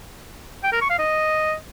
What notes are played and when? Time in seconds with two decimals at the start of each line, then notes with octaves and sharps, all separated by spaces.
0.63 G5
0.72 A#4
0.81 C#6
0.90 F5
0.99 D#5